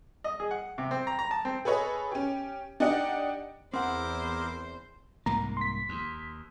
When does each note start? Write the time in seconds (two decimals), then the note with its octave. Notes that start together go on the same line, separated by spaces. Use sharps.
0.24 D#5
0.40 G#4
0.51 F#5
0.78 C3
0.91 C4
1.07 A#5
1.19 A#5
1.31 A5
1.45 C4
1.65 G#4 A4 B4 C#5 D#5
2.12 C#4 G4
2.80 D4 D#4 G4 D#5 F#5
3.74 E2 C4 E4 A#4 C5 F#5 D6
5.26 C2 G#2 A#3 A#5
5.57 C6 B6
5.89 D#2